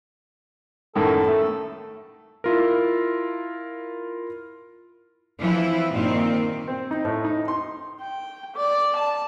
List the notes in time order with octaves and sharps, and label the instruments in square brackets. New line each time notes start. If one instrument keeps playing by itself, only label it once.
[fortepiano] F#2 A2 D#3 [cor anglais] A4
[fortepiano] A3
[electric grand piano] E4 F4 A#4
[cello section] E3 F3 C4 E4
G2 A#2 D#3 C4
[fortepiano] C4
D#4
A2
D#4
C6
[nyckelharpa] G5
D5
A5